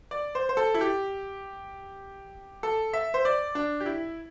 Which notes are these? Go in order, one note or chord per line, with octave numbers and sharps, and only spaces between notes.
D5
C5
C5
A4
E4
G4
A4
E5
C5
D5
D4
G4
E4